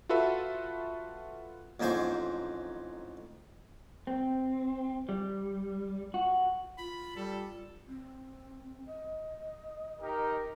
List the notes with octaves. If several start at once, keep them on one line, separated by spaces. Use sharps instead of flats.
F4 F#4 A4 B4 E5
A1 F2 G#2 C5 G#5 C#6
C4
G3
F#4
F4 B5
G3 A4
C4
D#5
D#4 G4 A#4